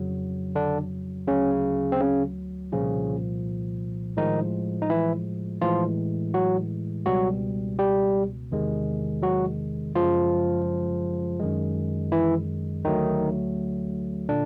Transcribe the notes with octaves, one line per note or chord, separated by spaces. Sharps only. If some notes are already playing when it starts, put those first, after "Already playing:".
Already playing: F2 C#3 F#3
D3 D4
D2 C#3 F#3 C#4
C4
C#3 C#4
C2 A#2 C#3 F3 C#4
A2 D#3 F3 G#3 D#4
D#4
E3 E4
A2 E3 F3 G#3 F4
F#3 F#4
C#2 B2 F#3 G3 F#4
G3 G4
E2 C3 D#3 G#3
F#3 F#4
F#2 C#3 F3 G#3 F4
F#2 D#3 G#3
E3 E4
D2 D3 D#3 F#3 A3 D#4
A#2 D3 D4